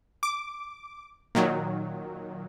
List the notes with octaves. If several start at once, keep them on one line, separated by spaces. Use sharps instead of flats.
D6
A#2 D#3 F#3